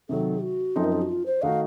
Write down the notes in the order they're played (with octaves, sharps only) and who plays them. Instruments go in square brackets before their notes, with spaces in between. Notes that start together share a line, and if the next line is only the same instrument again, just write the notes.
[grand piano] C3 D#3 F#3 [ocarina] A4
[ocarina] F#4
[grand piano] F#2 F3 C4 D#4 [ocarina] A4
[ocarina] A#4
A4
F#4
F4
C5
[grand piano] D#3 A3 D#4 F#4 [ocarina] F5